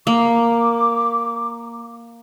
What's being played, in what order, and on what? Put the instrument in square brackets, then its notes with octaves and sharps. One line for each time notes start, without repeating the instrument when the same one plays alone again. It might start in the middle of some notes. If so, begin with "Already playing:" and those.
[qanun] A#3 [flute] D6